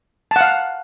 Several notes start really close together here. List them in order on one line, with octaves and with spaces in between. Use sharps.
A5 F#5 F5